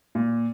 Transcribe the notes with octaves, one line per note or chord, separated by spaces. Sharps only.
A#2